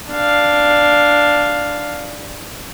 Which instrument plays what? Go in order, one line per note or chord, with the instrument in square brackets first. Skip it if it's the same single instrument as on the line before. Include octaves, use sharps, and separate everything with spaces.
[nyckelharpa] D4 F5